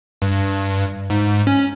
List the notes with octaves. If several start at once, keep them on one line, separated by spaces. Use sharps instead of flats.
G2
G#2
C#4